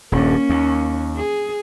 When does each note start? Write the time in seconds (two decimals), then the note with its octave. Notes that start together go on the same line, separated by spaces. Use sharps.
0.12 D#1 G2 A#3 C#4
0.50 D#2
1.17 G#4